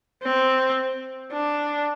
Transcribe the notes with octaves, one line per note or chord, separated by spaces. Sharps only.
C4
D4